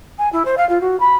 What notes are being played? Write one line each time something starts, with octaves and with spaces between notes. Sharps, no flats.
G#5
E4
C5
F5
F4
F#4
B5